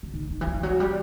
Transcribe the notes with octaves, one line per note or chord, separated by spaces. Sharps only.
D3
D#3
D#3
E3
F3
F#3
G3